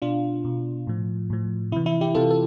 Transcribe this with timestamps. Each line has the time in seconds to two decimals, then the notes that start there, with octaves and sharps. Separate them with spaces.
0.02 B2 D4 F4
0.45 B2
0.87 A2 F3
1.30 A2 F3
1.72 C3 E4
1.76 E3
1.86 E4
2.01 E4 G4
2.14 C3 E3 F4 A4
2.30 A4